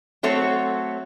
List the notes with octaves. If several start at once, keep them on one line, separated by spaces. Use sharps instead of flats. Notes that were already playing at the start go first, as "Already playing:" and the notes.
F#3 A3 C4 C#5